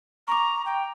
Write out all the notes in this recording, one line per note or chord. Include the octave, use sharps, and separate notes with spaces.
A#5 C#6 D6
G5